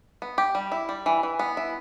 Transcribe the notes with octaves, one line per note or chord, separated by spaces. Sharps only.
B3
G4
G3
E4
G3
E3
E3
B3
E4